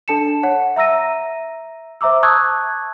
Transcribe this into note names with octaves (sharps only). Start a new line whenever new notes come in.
D4 A4 A5 C#7 E7
C#5 F#5
E5 A#5 E6 A#6 D#7
C5 E5 A#5 D6 E6
A5 C#6 D#6 E6 F#6 G#6